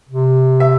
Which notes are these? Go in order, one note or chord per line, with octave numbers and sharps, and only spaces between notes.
C3
E5